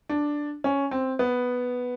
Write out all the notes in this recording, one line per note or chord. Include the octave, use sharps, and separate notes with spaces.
D4
C#4
C4
B3